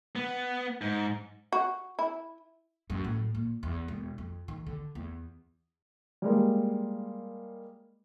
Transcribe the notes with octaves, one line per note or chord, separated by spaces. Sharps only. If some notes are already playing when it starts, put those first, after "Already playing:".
B3
G#2
F#4
E4
F#2
A2
A#2
E2
E1
F2
D#3
D3
E2
G3 G#3 A#3